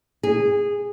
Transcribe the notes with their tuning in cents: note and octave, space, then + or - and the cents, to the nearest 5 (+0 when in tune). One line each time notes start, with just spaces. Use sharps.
G#4 -15